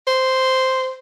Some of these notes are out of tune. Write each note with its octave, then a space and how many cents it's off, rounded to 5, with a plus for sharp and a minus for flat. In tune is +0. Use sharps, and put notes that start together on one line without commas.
C5 -5